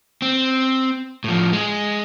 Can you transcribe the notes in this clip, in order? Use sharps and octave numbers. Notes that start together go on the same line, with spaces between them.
C4
A2 F3
G#3 G#4